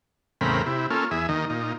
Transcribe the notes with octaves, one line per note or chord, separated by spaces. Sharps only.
E2 A2 C#3 C4 A#4 B5
C3 E4
A#3 C#4 F4 A4
E2 G#4 E5
D#2 D#3 D#5
A#2 D#4